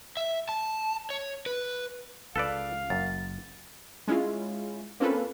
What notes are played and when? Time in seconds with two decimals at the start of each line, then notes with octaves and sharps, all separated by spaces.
0.17 E5
0.49 A5
1.10 C#5
1.46 B4
2.36 C#2 A4 B4 D5 F5
2.90 F#1 F#2 A6
4.08 G#3 C#4 E4 F4
5.00 A#3 C4 C#4 F4 A4 B4